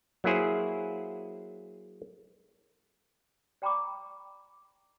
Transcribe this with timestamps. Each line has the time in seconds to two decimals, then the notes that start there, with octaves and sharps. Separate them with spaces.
0.24 F#3 A#3 E4 G#4 C5
3.62 D5 G5 A#5 B5 C#6 D6